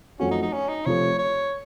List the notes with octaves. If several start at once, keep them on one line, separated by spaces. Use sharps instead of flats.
F#2 F3 A3 C4 C#4 F#4
D#4
D#4
C#4
D#4
C3 F3 A3 C#5
C#5